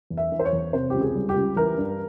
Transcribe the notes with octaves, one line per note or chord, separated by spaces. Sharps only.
E2
E5
E3
C5
C#5
E2
C3 C5
C#2 G4
G#4
G3
G4
C#2
E3 A#4
G2